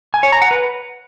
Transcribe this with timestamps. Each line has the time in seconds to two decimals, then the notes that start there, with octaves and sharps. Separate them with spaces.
0.14 G#5
0.23 C#5
0.32 A#5
0.42 F#5
0.51 B4